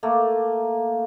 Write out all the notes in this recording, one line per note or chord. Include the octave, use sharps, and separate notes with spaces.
A3 A#3